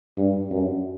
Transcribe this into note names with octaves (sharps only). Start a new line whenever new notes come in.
G2
F#2